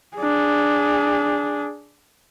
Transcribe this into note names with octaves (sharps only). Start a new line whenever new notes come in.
D4 G#4